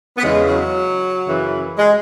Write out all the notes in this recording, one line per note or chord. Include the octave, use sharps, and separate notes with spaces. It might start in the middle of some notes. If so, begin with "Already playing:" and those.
B3
E2 C#3 E3 G#3
F#3
F#2 C#3 E3
G#3